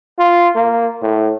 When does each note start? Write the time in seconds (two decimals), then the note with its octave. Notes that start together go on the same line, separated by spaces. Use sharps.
0.19 F4
0.56 A#3
1.02 A2